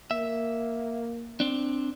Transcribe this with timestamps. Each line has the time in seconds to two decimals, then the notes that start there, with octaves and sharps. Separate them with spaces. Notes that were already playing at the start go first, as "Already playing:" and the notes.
0.11 A#3 E5
1.40 C4 D4